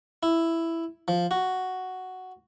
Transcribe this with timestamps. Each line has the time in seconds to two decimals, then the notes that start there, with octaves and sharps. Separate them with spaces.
0.23 E4
1.08 F3
1.31 F#4